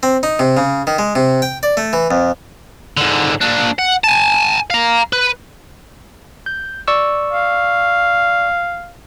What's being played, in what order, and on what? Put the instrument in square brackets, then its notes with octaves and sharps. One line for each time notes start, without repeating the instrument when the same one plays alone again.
[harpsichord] C4
D#4
C3
C#3
D#3
G#3
C3
G5
D5
A3
E3
F2
[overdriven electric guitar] G#2 D3
A#2 D4
F#5
G#5 A5
F5 A#5
B4
[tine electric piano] G6
D5 C#6 E6
[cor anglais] F5